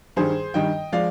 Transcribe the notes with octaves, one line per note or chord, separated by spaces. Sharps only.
G2 D#3 G3 G#4 C5
G2 D#3 G3 D#5 G5
F3 G#3 D5 F5